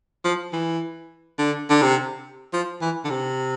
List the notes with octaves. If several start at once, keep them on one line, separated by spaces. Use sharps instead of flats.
F3
E3
D3
D3
C3
F3
E3
D3
C3